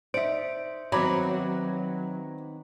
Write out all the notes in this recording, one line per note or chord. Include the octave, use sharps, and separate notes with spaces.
D#4 C5 D5 E5 D7
D#3 F#3 B3 C4 A#5 B5 D6